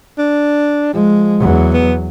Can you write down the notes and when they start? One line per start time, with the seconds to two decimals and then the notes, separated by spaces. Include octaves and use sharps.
0.19 D4
0.94 F3 G#3
1.39 E2 F#3
1.74 B3